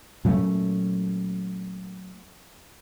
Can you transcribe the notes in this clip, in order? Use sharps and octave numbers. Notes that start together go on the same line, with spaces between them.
A#2 F#3 A3 C#4